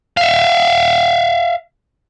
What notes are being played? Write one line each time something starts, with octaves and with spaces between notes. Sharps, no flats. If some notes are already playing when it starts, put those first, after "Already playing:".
E5 F5